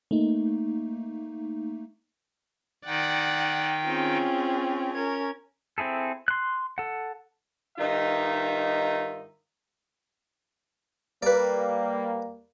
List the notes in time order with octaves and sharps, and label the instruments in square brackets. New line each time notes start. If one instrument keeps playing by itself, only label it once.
[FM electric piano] A3 A#3 D#4
[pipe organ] D#3 D#4 G5 [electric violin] D5 F#5
[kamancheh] C4 C#4 [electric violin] F4 G#4
[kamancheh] C#4 A#4 [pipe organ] G#6
[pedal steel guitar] C4 E4 G#4 A4
C6 F#6
A4 F#5
[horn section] G2 D#3 D#4 F4 E5
[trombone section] G3 A#3 [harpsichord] B4 D5